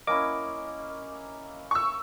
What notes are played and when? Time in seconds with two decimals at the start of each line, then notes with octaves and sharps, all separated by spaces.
0.07 A#3 C#4 E4 D#5 D6
1.71 C#6 E6